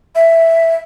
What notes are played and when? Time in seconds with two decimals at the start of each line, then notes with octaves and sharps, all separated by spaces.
0.15 E5